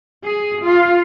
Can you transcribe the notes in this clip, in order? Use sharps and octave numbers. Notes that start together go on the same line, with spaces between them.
G#4
F4 F5